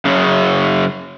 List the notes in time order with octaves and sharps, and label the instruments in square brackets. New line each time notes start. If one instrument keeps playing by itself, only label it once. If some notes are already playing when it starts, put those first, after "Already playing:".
[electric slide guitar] F#2 C#3